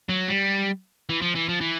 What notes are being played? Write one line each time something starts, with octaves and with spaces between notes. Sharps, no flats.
F#3
G3
E3
F3
E3
F3
E3